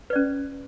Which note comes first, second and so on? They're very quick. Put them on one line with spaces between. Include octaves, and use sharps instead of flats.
B4 D5 C#4